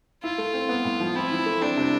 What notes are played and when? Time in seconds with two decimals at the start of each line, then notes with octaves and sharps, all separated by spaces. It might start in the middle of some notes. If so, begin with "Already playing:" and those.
0.23 E4 F4
0.38 A3
0.54 C4
0.69 B3
0.85 A2
1.00 F3
1.15 C4 E4
1.32 E3
1.46 A3
1.61 C4 D4
1.77 C3